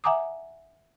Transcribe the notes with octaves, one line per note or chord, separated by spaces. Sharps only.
E5 F#5 G#5 A#5 D6 D#6